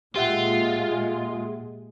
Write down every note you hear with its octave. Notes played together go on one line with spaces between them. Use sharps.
A#2 G#3 F4 G4 E5 F#5